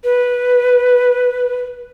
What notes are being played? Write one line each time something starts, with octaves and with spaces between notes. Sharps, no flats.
B4